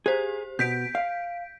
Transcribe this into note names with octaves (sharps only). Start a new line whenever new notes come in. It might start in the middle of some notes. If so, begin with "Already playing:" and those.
G4 G#4 C5
B2 G6 B6 D7
F5